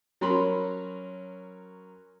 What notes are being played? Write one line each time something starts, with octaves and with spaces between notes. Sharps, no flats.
F#3 C#4 A#4 B5 C6